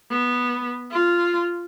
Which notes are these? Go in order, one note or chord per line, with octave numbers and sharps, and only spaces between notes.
B3
F4